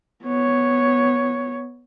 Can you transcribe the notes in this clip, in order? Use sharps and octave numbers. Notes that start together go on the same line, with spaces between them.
B3 C#5